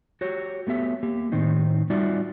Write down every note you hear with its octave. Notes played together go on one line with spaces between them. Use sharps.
F#4 G4 C#5
A3 B3 G4 E5
A#3 G4
A2 D#3 C4 D#4
G3 D#4 F4 F#4 D5 E5